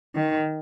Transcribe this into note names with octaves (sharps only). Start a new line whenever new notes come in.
D#3